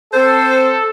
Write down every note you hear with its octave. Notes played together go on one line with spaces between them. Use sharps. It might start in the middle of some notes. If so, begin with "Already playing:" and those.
C4 A4 C5